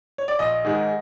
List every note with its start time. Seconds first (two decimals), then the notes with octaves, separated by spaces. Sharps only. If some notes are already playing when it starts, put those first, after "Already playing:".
0.18 C#5
0.28 D5
0.39 A#1 D#5
0.64 G#2 D#3 G#3